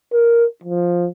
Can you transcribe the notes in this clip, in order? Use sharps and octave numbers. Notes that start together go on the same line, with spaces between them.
A#4
F3